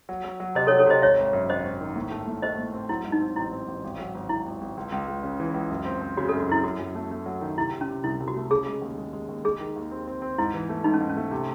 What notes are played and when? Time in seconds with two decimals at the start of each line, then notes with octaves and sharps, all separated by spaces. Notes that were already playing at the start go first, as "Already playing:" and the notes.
0.09 F#3
0.24 F#3
0.40 F#3
0.55 C3 C5 D#5
0.67 A4 C#5
0.71 F#3
0.78 A4 C#5
0.86 C3 C5 D#5
1.02 G#1 C#5 E5
1.18 G#1
1.33 F#2
1.49 G#1 C5 D#5
1.65 G#1
1.81 D#3
1.96 A2
2.11 A3
2.27 A2
2.42 A3 C5 D#5
2.58 A2
2.74 C4
2.89 F#3 E4
3.05 G#2
3.12 D#4
3.21 C4
3.36 A1 E4
3.53 C4
3.68 A1
3.84 G#1
3.99 F#3
4.15 G#1
4.29 G#1 E4
4.46 G#1
4.61 G#1
4.77 C#2
4.92 C#2
5.08 C#2
5.23 C#3
5.40 E3
5.54 C#2
5.71 F#2
5.85 C4
6.01 C4
6.17 C#3 F#4
6.29 A4
6.33 F#2
6.40 F#4
6.49 F#2 E4
6.63 F#2 F#4
6.79 F#2
6.95 A3
7.11 A3
7.26 F#3
7.41 D#3
7.58 C3 E4
7.73 C3
7.81 C#4
7.88 C3
8.04 C2 E4
8.20 C2
8.28 F#4
8.36 A3
8.51 C#3 G#4
8.66 G#3
8.82 D#2
8.98 G#3
9.13 G#3
9.28 D#2
9.44 G#3 G#4
9.60 D#3
9.76 D#2
9.91 C4
10.07 C4
10.22 C4
10.38 G#2 E4
10.54 E3
10.69 A3
10.84 G#2 D#4
10.93 C#4
11.01 G#2
11.09 C#4
11.17 A3
11.31 C3